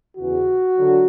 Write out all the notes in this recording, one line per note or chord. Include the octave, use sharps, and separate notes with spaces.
E2 C#3 E3 F#4
D3 F#3